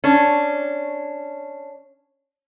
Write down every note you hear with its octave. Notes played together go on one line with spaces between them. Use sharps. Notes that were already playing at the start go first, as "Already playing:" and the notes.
C#4 D4